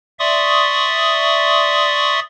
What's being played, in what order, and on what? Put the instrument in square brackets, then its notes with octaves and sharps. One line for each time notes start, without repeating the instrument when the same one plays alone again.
[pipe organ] D5 E5 C6 C#6 D#6